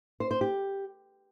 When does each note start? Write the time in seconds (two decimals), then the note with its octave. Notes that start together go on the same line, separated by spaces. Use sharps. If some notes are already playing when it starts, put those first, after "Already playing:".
0.20 C5
0.31 C5
0.41 G4